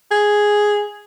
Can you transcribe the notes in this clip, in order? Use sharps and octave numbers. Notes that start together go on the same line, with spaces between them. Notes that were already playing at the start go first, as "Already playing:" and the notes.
G#4